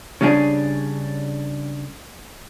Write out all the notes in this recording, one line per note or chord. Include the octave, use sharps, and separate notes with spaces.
C#3 G3 C#4 D4 G#4